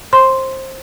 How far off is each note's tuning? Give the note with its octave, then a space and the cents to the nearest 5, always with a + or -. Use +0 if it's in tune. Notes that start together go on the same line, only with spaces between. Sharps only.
C5 +20 C6 +0